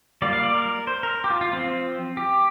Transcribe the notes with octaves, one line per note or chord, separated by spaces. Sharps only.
G3 A#3 F4 D5
F5
D5
A#4
C5
A#4
G4
F4
F4
F3 C4 F4
G4